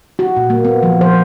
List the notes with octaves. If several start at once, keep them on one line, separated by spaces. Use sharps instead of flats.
F#4
A#2
A#3
B3
F3
C5